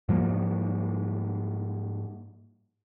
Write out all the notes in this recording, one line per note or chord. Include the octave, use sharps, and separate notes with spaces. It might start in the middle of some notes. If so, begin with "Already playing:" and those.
G#2 F3 G3 A#3